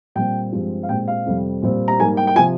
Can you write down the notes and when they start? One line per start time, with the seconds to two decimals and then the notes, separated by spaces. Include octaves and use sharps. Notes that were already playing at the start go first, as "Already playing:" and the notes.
0.15 A#2 G3 C4 G5
0.52 G2 F3 G#3 C4
0.83 F5
0.89 A#2 G#3 C4 G5
1.08 F5
1.26 F2 C3 G3
1.62 A#2 G3 C4
1.88 A#5
1.99 G#2 G3 A#3 G#5
2.17 G5
2.27 G5
2.36 C3 F3 G#5